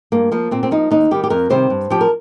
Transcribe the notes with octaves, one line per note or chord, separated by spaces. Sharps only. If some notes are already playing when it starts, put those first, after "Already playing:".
G2 A#3
F3 A#3
A#2 C4
C4
F3 D#4
D#2 D#4
D#3 G3 G4
G4
F2 A#4
C3 D#3 G3 C5
G2
F3 G4
A#4